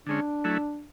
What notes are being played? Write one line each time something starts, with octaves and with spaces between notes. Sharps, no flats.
D3 G#3 C#4 D4
F#3 A3 E4